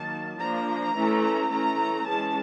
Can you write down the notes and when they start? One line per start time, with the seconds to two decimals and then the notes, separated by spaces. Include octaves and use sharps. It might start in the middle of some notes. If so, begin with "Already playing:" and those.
Already playing: D#3 F#3 A#3 A5
0.39 F3 A#3 D4 A#5
0.95 E3 A3 C#4
1.50 E3 A3 C#4 A#5
2.06 E3 G#3 C#4 A5